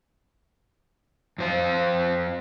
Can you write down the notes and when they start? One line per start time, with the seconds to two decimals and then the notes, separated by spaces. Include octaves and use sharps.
1.38 F2 C5 F5